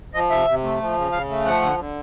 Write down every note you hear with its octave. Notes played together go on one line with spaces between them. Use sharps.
F3 D#5
C3 E5
C3
A3
F3
C#3
C#3 F5
A3
F3 F#5
D3
D3